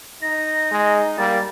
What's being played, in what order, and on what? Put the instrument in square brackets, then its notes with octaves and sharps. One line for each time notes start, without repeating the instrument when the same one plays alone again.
[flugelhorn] D#4 [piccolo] A#6
[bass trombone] G#3
[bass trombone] G3 [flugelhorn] A#3 [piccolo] A6